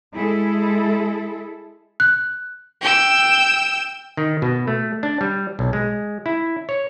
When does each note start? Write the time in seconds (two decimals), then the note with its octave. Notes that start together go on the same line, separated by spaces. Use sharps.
0.13 G#3 E4 G#4 A4
2.00 F#6
2.82 G5 E6
4.17 D#3
4.42 B2
4.67 A3
5.03 D4
5.21 G3
5.59 B1
5.73 G#3
6.26 E4
6.69 C#5